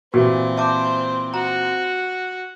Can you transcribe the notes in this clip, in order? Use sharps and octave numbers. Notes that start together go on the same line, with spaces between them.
A#2 E3 C4 F#4 G4
C5 E5 A5 D6
F#4 A#5